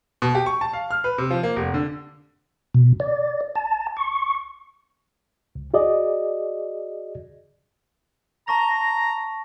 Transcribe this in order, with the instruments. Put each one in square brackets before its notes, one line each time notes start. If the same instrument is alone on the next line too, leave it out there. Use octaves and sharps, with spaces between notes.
[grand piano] B2
G4
C#6
A5
F5
F6
B4
C3
F3
A#3
F1
D3
[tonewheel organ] B2
D5
A5
C#6
[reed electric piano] C#2
F#4 G#4 D5 D#5
[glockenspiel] A5 C#6 A#6 [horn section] A#5